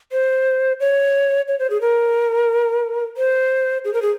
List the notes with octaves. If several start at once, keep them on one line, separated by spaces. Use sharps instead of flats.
C5
C#5
C#5
C5
G#4
A#4
C5
G#4
A#4
G#4